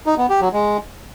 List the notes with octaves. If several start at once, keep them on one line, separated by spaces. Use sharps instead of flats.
D#4
B3
G4
F#3
G#3